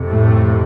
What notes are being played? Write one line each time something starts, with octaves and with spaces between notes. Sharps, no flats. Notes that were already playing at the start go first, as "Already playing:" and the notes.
Already playing: F2 C3
A2 A3